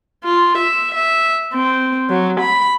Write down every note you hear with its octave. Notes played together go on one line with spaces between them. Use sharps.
F4
E5
E5
C4
F#3
B5